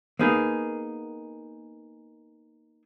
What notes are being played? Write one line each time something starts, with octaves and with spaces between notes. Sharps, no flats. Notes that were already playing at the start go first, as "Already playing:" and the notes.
A#3 B3 D#4 G#4